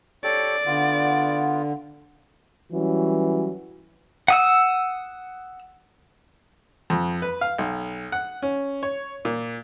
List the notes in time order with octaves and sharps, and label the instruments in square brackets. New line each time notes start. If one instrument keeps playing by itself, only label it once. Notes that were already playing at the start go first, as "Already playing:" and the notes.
[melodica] G4 A4 C#5 [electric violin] D5
[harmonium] D3 [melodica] B3 F4
[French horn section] E3 F#3 G3 C#4 F#4
[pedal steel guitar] F#5 D#6 E6
[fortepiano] F2
B4
F5
B1
F#5
C#4
C#5
A#2